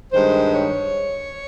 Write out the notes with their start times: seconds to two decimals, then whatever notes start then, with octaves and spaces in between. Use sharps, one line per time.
0.12 G2 D#3 G#3 C5
0.54 C#5